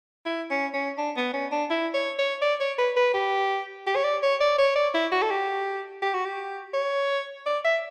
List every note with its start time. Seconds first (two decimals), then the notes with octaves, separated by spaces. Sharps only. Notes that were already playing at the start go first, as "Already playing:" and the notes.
0.25 E4
0.51 C#4
0.73 C#4
0.98 D4
1.17 B3
1.33 C#4
1.52 D4
1.70 E4
1.94 C#5
2.18 C#5
2.42 D5
2.60 C#5
2.78 B4
2.96 B4
3.14 G4
3.87 G4
3.96 C#5
4.04 D5
4.22 C#5
4.41 D5
4.58 C#5
4.76 D5
4.94 E4
5.12 F#4
5.22 A4
5.31 G4
6.02 G4
6.14 F#4
6.25 G4
6.74 C#5
7.46 D5
7.64 E5